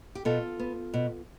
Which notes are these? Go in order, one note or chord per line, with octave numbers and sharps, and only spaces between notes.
G4
B2 F4 A4
B3
B2